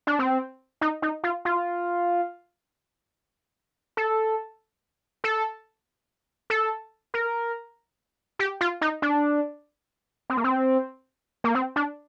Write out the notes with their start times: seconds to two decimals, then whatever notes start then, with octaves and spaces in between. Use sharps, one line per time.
0.07 D4
0.19 C4
0.81 D#4
1.02 D#4
1.24 F4
1.45 F4
3.97 A4
5.24 A4
6.50 A4
7.14 A#4
8.39 G4
8.61 F4
8.81 D#4
9.02 D4
10.30 C4
10.37 A#3
10.44 C4
11.44 A#3
11.55 C4
11.76 D4